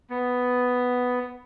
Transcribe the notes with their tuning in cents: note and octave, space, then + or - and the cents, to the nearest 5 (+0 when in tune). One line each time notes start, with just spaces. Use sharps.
B3 +5